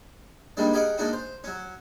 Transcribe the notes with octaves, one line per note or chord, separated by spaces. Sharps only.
D#3 G3 G#3 A#3 D4
G4 G#4 A#4 D#5 F5 F#5
G#3 A#3 D4 D#4 F#4
C5
F#3 C#4